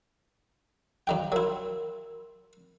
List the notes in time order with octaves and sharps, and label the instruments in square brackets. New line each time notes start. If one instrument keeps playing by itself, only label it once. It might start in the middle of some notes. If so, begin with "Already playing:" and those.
[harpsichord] F#2 D#3 G5 [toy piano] F5
[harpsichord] F#3 E4 [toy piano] A#4 C6